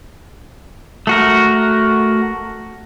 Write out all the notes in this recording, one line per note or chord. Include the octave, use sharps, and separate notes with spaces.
A3 F#4 A#4